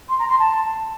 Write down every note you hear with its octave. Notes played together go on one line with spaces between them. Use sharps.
C6
A#5
C6
A5